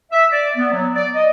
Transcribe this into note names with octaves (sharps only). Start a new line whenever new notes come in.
E5
D5
B3
F#3
D5
D#5